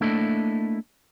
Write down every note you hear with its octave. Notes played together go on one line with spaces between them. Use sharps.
A3 A#3 D4 E4 A4 D#5